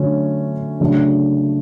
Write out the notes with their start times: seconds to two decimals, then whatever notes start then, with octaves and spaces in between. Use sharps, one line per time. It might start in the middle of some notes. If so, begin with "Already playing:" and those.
Already playing: D3 F#3 A3 C#4
0.80 C#3 F#3 A3 D4